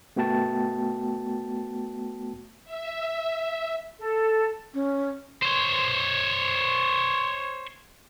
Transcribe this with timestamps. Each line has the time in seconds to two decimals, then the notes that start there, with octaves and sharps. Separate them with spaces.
0.16 A3 B3 F#4 G5 A5 A6
2.65 E5
3.99 A4
4.74 C#4
5.43 C5 C#5